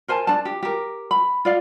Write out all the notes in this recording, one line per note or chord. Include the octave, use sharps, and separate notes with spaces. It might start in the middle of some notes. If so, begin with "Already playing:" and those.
A#4 C5 G#5 A5
D4 A5
G4
G4 A#4
B5
F4 D5 F5